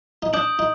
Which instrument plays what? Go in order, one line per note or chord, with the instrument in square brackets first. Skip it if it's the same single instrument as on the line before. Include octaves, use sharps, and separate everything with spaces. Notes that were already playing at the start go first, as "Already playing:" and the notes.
[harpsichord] D#4
[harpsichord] D4 [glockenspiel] D#6 G6 D7 F#7
[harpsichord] D#4